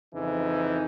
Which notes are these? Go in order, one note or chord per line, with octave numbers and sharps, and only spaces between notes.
F2 C#3 E3 D#4